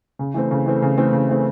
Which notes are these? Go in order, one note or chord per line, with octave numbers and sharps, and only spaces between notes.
C#3
E3 A3 C4
C#3
E3 A3 C4
C#3
E3 A3 C4
C#3
E3 A3 C4